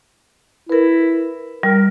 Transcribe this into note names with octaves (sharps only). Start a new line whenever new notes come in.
E4 A#4 B4
G3 A#4